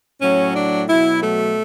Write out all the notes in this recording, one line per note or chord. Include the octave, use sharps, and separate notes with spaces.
A2 F#3 C#4
D4
B2 F#3 E4
A3